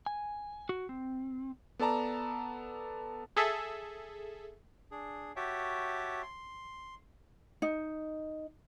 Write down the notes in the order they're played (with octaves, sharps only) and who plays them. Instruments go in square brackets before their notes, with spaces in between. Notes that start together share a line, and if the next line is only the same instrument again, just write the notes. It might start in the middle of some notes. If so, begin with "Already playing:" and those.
[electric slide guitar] G#5
F#4
C4
[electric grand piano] B3 A4 D5 A5 A#5
[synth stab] G#4 A4 E5
[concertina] D4 G#4
F#4 G4 C#5 E5 G5 A5
C6
[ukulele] D#4